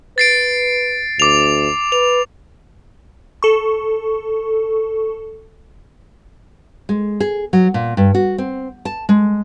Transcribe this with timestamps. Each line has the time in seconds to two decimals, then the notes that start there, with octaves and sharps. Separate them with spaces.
0.18 B4 A6 C7 D7
1.20 D2 D6 F7
1.92 B4 F7
3.43 A4 C#6
6.89 G#3
7.20 G#4
7.53 F#3
7.74 A#2
7.97 G2
8.14 F#4
8.38 C4
8.85 A5
9.09 G#3